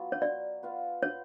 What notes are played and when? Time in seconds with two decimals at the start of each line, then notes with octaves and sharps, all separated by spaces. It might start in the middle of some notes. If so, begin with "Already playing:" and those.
Already playing: F#3 B3 F4
0.12 C#5
0.22 D5
0.63 B3 F4 B4 F5
1.03 C#5